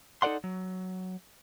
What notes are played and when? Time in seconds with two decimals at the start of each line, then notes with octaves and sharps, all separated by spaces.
0.22 D#4 A4 A#4 D5 F#5 C6
0.44 F#3